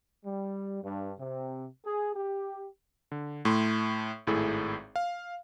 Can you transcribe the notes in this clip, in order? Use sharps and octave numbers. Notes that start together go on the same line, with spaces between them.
G3
G2
C3
G#4
G4
D3
A2 A3 C6
G#1 A2 E4 G#4 A4
F5